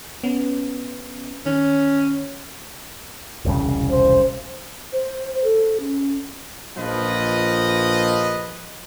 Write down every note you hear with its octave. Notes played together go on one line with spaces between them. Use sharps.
B3 C#4
D#3 C#4
E1 C2 C#3
C5
C5
A4
C#4
A#1 F3 B4 D#5